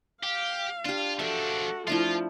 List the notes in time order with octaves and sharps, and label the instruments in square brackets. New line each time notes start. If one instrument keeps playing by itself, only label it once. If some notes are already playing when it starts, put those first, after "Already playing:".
[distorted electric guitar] G4 [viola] F5
[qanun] D4 G4 [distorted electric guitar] F4
[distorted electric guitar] F3 D4 [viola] F#4 A4 [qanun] E5
[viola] F3 [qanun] A3 D4 E4 [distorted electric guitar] F4